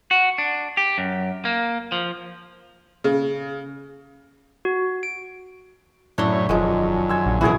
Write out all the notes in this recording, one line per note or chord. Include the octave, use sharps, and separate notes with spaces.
F#4
D4
G4
F#2
A#3
F3
C#3
F#4
D7
F#2 A2 D4 E4 C#5 A#5 C6
E1 F#2 D#3 F3 G#3
G#5 C6 E6
A#1
B2 E3 F#3 E4 F#4 G#4 A#4 G#5